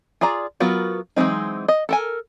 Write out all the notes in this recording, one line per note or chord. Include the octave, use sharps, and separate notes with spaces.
F4 G#4 D5 A#5
F#3 B3 F4 F#4 A#4
E3 F#3 G#3 C4 D#4
D#5
A4 A#4 G#5